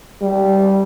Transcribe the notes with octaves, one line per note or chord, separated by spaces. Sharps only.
G3